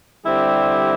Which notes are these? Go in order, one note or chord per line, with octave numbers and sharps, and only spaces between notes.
D3 G3 C4 E4 G4